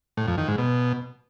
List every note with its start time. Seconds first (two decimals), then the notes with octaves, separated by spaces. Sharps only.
0.17 A2
0.28 F2
0.38 D#3
0.48 G#2
0.58 B2